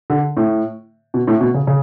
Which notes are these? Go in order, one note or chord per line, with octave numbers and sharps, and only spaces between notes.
D3
A2
B2
A2
B2
C#3
C#3